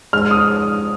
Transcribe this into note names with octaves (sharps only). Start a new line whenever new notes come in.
G#3 F6
D#6